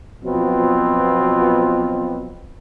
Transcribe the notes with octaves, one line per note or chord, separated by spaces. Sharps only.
B2 F3 F#3 B3 C4 F4